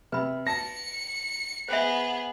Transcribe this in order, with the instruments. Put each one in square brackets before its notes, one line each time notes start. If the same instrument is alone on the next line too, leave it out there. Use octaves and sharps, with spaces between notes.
[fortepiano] C3 [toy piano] B4 B5
[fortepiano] A5 [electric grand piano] A#6 [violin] C#7
[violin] B3 G#4 [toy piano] C5 E5